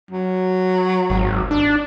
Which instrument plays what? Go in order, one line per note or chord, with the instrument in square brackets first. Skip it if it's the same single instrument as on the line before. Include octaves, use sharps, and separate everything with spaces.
[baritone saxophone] F#3
[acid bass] G#1
D4